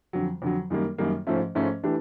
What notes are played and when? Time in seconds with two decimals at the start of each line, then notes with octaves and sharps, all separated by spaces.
0.13 F2 D3 F#3
0.42 F2 D3 F#3
0.70 F#2 D#3 G3 A#3
0.98 F#2 D#3 G3 A#3
1.27 G#2 F3 A3 C#4
1.55 G#2 F3 A3 C#4
1.83 E3 A3 D4 G4